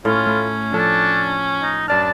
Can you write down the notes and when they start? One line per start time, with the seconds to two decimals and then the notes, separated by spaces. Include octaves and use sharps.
0.05 A2 C#4 F4
0.27 A3 B5
0.73 F3 D4 A4
1.62 D#4
1.88 F#2 D4 D5 A5 F6